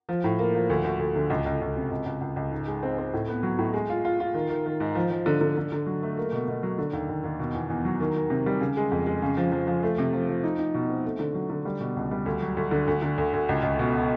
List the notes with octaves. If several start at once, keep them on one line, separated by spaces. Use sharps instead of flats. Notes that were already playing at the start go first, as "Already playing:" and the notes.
F3
A2
A#3
F3
D2
D2
D2
D3
C#2
C#2
C#2
C3
C#2
C#2
C#2
C#2
G#2
G#3
C4
C4
A2
B3
F#3
A2
G#3
F4
F4
F4
D#3
D#3
D#3
G#2
F3
F3
D3
D3
D3
D3
F#3
A3
A#3
B2
B2
F#3
D3
D#2
D#2
D#2
B2
E2
E2
F#3
D#3
D#3
C3
G3
C#3
G#3
F2
G#3
C#3
F3
F3
F3
A3
C3
F3
F3
D#4
D#4
B2
C4
A3
D3
F#3
D3
G3
B2
C#2
G3
D2
F#3
D2
D3
D2
D3
D2
D2
C#2
C#2
B2